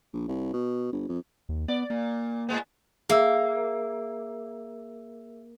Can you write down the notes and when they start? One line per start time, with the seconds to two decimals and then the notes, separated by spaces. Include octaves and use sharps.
0.13 A#1
0.28 C2
0.53 B2
0.92 G1
1.09 F2
1.49 D#2
1.68 B3 D5
1.90 A#2 A#3
2.49 A2 G#3 B3
3.09 A#3 G#4 E5 E6